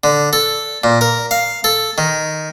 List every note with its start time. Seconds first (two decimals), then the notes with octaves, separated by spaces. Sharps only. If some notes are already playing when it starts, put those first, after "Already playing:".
0.04 D3
0.33 A4
0.84 A#2
1.01 A#4
1.31 F5
1.64 A4
1.98 D#3